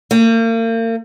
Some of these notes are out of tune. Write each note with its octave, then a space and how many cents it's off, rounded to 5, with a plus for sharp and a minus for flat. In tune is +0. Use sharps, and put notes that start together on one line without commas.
A#3 -40